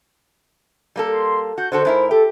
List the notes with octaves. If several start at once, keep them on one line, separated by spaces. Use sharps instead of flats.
G3 A#3 A4
C6
F#4 G6
D3 F#4 A4 C5
G#2 E4 A#4
G4 A4